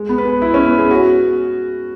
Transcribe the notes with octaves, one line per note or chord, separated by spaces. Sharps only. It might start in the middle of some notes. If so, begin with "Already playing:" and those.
Already playing: G#3
B3
B4
G#4
E4
C#4
B3
G#4
F#4